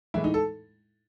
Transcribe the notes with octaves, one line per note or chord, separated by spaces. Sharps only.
A2 E3 G#3 E4
D#4
A4